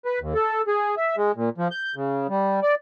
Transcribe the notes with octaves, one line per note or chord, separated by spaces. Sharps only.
B4
D#2
A4
G#4
E5
G#3
A#2
F3
G6
C#3
G3
D5